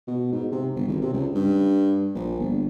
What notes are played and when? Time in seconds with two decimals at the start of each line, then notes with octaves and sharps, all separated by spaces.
0.08 B2
0.32 G#2
0.52 C3
0.76 G1
0.88 G#1
1.02 C3
1.13 C#2
1.35 G2
2.15 A#1
2.40 G1